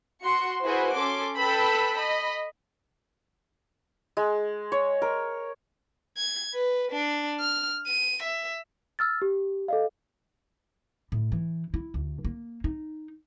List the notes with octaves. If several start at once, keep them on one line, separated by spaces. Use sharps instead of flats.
F#4 C6 C#7
E4 F#4 G#4 B4 C5
C#4 A4 C6 D6
A4 B4 G5 B5 E6
D#5 B5
G#3
C#5
A#4
G#6
B4
D4
F6
D#7
E5
E6 F6 A6
G4
A4 D#5 F5
A2
E3
E4
D2
A#3
D#4